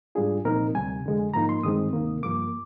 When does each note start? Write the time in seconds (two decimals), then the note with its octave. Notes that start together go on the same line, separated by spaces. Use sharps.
0.15 G#2 G3 D4 F4 G#4
0.45 C2 A#2 F3 C4 D#4 A#4
0.75 D2 C3 G3 G#5
1.04 F2 D3 G#3
1.34 G#2 F3 A#3 D#4 A#5
1.49 C6
1.63 G2 D#3 G#3 C4 D#6
1.93 D2 C3 D#3 A#3
2.23 G2 F3 A#3 D6